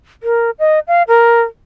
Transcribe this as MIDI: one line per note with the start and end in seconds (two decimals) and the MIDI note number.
0.23 0.50 70
0.59 0.79 75
0.88 1.03 77
1.08 1.42 70